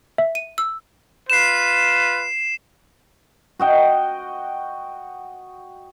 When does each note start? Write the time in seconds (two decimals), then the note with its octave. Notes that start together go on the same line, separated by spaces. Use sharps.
0.18 E5
0.35 D#7
0.58 E6
1.30 F4 B4 C7 E7
3.59 F#4 D#5 G5